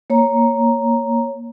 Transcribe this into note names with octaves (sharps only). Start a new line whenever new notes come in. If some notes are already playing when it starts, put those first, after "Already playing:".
A#3 C#5 A#5